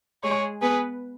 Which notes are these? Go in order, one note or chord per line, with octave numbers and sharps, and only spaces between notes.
G#3 G#4 C#5
B3 G#4 B4